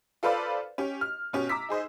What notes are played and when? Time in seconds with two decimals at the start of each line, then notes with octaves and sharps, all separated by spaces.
0.23 F4 A4 B4 C5 D5 F5
0.78 C#4 G4
1.01 F6
1.33 B2 C#4 G4
1.49 A#5 D6 E6 B6
1.69 D#4 G#4 C5 D#5